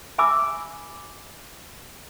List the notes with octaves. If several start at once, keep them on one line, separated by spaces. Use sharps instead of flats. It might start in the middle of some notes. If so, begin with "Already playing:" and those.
E5 G#5 B5 D6 E6